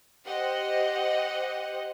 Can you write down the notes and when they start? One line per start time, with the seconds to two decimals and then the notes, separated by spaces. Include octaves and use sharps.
0.24 G4 C5 D#5 F#5